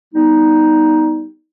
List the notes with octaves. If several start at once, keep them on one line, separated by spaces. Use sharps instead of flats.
G3 B3 D#4